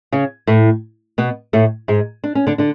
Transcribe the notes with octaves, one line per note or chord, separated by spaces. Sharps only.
C#3 C#4
A2 A3
B2 B3
A2 A3
G#2 G#3
D4
C#4
D3 D4
D3 D4